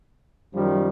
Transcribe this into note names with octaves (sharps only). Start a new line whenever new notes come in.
F#2 D#3 F3 G3